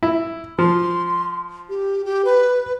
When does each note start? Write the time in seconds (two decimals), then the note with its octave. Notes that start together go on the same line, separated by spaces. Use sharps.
0.03 E4
0.59 F3 C6
1.69 G4
2.05 G4
2.25 B4